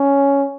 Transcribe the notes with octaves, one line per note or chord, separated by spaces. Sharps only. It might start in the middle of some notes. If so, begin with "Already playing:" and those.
Already playing: C#4